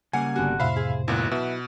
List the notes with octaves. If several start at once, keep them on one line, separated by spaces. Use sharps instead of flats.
C#3 G3 A#3 F#5 G#5
G1 D3 B3 F#4 G4
F2 A2 C3 C5 E5 F5 B5
G#4
G#1 A#2 F#3 B3 E4
B2 B4 E5